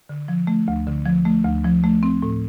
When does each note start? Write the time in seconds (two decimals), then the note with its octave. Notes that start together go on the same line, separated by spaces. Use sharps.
0.09 D3
0.28 F3
0.47 A3
0.68 D2
0.87 D3
1.06 F3
1.25 A3
1.45 D2
1.65 F3
1.84 A3
2.03 C4
2.22 A2